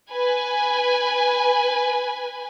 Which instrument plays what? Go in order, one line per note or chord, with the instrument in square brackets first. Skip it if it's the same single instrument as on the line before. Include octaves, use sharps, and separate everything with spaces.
[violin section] B4 G#5